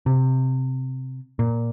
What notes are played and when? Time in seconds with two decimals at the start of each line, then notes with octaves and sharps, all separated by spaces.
0.06 C3
1.39 A#2